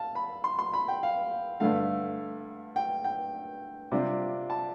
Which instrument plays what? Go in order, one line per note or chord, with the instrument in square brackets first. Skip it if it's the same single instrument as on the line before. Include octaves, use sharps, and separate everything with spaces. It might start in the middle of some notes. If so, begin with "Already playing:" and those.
Already playing: [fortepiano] F5 A5
B5
C6
C6
B5
G5
F5
G2 D3 A3 F5
G5
G5
C3 G3 D4 F4
A5